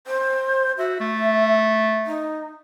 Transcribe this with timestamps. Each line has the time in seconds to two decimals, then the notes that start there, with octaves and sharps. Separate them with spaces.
0.07 C5
0.78 F#4 E5
1.00 A3
2.06 D#4